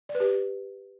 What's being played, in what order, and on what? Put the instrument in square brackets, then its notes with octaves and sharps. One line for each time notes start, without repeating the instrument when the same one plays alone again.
[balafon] D5
B4
G4